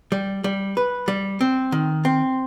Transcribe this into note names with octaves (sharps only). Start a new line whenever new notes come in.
G3
G3
B4
G3
C4
D#3
C4